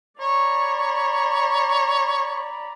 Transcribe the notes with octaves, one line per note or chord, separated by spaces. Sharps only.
C#5 D5 A#5 B5